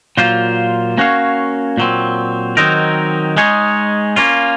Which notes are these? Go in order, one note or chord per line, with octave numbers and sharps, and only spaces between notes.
A#2 F#3 A#3 F4 C5
A#3 C#4 F#4 C#5 F5
A#2 F#3 C4
D#3 F#3 C4 D#4 A#4
G#3 D#4 G#4 C#5
A#3 C#4 F4